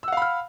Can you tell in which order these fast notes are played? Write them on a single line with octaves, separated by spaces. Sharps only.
E6 F#5 F5 B5 F6